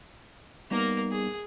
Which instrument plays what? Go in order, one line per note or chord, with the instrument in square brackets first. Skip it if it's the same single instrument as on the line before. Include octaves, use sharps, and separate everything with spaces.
[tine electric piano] G3 B3 D#4 [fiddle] A#3 A#4
[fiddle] G#4